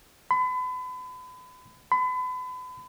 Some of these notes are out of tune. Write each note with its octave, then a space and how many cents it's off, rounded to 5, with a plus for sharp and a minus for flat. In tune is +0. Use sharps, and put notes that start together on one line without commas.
B5 +35
B5 +35